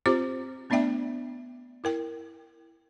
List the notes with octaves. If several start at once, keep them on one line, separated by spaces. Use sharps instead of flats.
C4 F4 G4 C5 D6
A3 B3 D4 D5 E5 G5
E4 A#4 G5